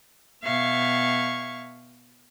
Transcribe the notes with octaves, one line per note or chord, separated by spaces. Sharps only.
B2 E5 F5 C#6 G#6